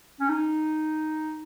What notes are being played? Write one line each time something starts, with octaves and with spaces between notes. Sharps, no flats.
C#4
D#4